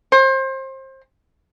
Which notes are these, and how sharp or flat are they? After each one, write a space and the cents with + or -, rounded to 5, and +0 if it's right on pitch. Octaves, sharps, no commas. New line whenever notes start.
C5 +30